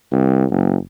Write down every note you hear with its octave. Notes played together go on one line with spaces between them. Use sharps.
C2
F#1